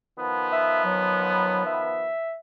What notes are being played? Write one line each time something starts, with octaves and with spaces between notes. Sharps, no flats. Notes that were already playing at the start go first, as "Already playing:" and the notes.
D#3 F3 B3
E5
F#3
E5